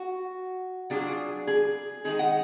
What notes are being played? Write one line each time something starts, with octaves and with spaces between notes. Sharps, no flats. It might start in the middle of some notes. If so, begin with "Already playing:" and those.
Already playing: F#4
F#3 D4 F4 G#4
G#4
D#3 G#3 D#4 G#4
F#5